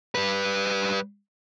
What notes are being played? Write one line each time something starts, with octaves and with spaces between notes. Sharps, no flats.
G3 B4